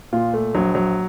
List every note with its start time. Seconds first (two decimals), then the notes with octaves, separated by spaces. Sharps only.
0.13 A#2 F4
0.34 A3
0.55 A#1 F#3
0.75 F#3